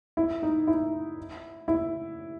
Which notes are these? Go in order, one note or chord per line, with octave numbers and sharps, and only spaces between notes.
E4
D#4
E4
E4